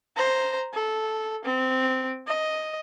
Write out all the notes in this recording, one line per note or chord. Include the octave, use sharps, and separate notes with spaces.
C5 A#5
A4
C4
D#5